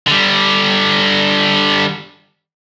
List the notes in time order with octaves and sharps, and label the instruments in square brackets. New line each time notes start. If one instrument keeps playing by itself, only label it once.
[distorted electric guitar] D3 G3